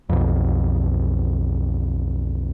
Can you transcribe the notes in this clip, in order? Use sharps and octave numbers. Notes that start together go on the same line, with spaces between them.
B1 F2